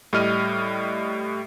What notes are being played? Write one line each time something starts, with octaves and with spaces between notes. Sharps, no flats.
A2 G3 D#5 F6 D#7